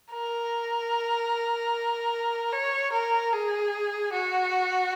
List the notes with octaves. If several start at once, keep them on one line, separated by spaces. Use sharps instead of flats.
A#4
C#5
A#4
G#4
F#4